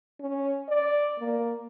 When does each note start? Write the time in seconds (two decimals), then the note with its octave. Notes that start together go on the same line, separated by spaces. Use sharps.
0.20 C#4
0.69 D5
1.19 A#3